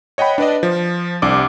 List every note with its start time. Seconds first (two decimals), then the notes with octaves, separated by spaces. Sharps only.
0.18 C#5 D#5 F#5 G5 B5
0.38 D4 B4 D5 D#5
0.63 F3
1.22 C2 D4 D5 D6